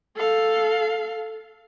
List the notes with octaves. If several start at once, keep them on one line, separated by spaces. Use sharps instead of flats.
A4 F5